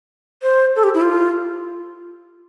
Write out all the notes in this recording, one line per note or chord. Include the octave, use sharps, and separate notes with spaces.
C5
A4
G4
E4
F4